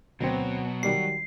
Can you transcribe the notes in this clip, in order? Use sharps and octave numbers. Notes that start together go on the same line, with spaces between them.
D2 B2 F#3 C4
D#3 G3 F#4 C7